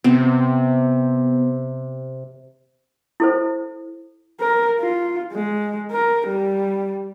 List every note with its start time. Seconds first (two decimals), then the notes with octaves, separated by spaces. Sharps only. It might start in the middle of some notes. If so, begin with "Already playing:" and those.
0.04 C3 B3 C4
3.20 E4 A4 C5
4.40 A#4
4.80 F4
5.32 G#3
5.91 A#4
6.28 G3